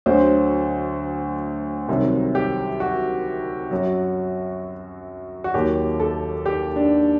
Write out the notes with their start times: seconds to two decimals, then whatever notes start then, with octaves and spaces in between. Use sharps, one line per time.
0.06 D2 D3 F#3 C5
1.88 C2 C3 D#3 F#3
2.35 G4
2.80 F#4
3.71 F#2 F#3
5.44 F#4
5.54 D#2 D#3 F#3 G4
6.00 A4
6.46 G4
6.76 D4